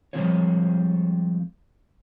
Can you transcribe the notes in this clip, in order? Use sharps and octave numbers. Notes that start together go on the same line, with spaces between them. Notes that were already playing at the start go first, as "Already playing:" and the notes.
F3 G3 G#3 C4 F4 C#5